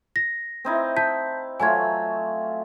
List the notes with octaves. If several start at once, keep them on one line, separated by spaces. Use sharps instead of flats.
A#6
C4 D#4 E4
A5 G6 B6
F#3 A3 F4 G#5 G#6